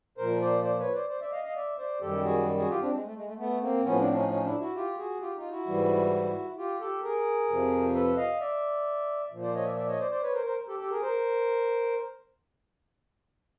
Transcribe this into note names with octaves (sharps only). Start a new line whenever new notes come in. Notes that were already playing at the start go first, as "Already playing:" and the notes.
A#2 F3 A#4 C5
C5 D5
C5 D5
B4 C#5
C5 D5
C5 D5
D5 E5
D#5 F5
D#5 F5
D5 E5
C5 D5
F#2 D#3 G3 G4 A4
F#4 G#4
F#4 G#4
F4 G4
C4 D4
G#3
A3
G#3
A3
A3 B3
A#3 C4
A2 F3 B3 C#4
C4 D4
C#4 D#4
C#4 D#4
D4 E4
E4 F#4
F4 G4
F#4 G#4
F4 G4
D#4 F4
E4 F#4
G#2 E3 G3
F4 G4
G4 A4
G#4 A#4
F2 C3 F3
A4 B4
D#5 F5
D5 E5
A#2 F3
C5 D5
C#5 D#5
D5 E5
D5 E5
C#5 D#5
C5 D5
C5 D5
B4 C#5
A#4 C5
A#4 C5
G4 A4
G4 A4
G#4 A#4
A#4 C5